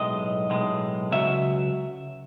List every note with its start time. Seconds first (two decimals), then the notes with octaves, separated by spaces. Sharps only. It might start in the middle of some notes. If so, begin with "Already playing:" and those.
Already playing: B1 A2 G#3 D#5
0.50 B1 A2 G#3
1.11 C#2 C#3 F#3 E5